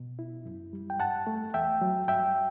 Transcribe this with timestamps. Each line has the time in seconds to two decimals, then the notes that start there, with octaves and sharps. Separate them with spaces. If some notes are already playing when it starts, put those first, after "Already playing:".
Already playing: B2
0.19 E4
0.45 F#2
0.73 G3
0.90 G5
1.00 G2 F#5 A5
1.27 A3
1.54 E2 E5 G5
1.81 F#3
2.08 G2 E5 G5